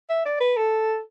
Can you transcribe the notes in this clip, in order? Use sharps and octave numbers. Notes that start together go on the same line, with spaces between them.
E5
D5
B4
A4